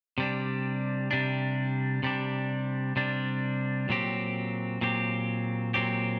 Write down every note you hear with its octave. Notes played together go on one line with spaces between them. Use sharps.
C3 G3 D4
C3 G3 D4
C3 G3 D4
C3 G3 D4
A#2 F#3 C4 G4
A#2 F#3 C4 G4
A#2 F#3 C4 G4